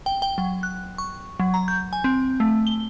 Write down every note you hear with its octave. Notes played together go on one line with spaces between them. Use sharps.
G5
G5
F#3
F#6
C#6
F#3
A#5
G6
G#5
C4
A3
G7